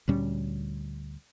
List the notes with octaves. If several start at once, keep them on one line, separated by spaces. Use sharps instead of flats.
D2 A#2 G3 C#4